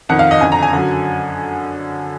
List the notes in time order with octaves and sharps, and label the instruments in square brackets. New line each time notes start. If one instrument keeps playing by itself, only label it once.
[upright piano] F2 D#3 F#5
F5
D#5
F2 D3 G#5
A#5
G#5
F#2 D3